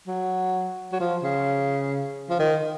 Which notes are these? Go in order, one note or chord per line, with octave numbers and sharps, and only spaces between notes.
F#3
F#3
F3
C#3
F3
D#3